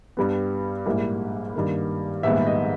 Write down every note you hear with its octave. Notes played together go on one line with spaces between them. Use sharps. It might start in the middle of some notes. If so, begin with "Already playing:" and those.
G2 G3 B3
A#1 G#2 G3 A#3 E4
G2 D#3 A#3
A#1 G#2 D#3 G3 B3 E5
D#5